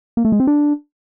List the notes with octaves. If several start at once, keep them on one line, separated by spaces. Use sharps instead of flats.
A#3
A3
G#3
C4
D4